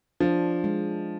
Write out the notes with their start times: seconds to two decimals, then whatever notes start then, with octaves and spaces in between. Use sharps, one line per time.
0.20 F3 D4
0.64 G#3